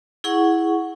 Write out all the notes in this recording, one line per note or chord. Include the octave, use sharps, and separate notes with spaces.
E4 G#4 F#5 C#6